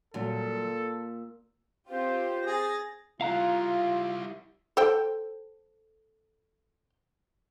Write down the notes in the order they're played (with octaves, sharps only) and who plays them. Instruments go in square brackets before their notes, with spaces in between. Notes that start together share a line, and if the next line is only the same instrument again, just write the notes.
[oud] A#2 [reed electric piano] D3 F#3 G3 [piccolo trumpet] A4
[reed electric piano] E6
[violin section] C4 F4 G4 [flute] C5
[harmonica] G#4 [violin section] A6 A#6
[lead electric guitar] G3 E4 [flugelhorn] F4 [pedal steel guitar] F5 A#5 F#6
[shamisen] A4 C5 G5